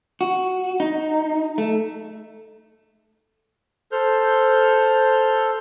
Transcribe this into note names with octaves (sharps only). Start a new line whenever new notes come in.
F#4
D#4
A3
A4 C5 F6 G6